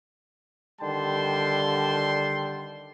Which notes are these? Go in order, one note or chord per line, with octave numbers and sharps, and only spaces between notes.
D3 D#3 G3 G5 A5 C6